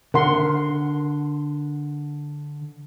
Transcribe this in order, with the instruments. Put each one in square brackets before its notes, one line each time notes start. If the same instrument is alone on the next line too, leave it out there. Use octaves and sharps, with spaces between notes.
[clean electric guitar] D3 [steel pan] A#4 F#5 C6